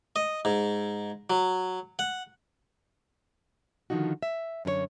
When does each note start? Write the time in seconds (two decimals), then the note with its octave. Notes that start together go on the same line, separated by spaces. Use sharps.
0.16 D#5
0.45 G#2
1.30 F#3
1.99 F#5
3.90 D3 D#3 F3 D#4 F#4
4.23 E5
4.65 F#2 D3 A#4 C#5